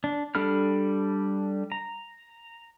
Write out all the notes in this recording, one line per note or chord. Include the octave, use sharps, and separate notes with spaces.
D4
G3 D4 A4 B5 F6
A#5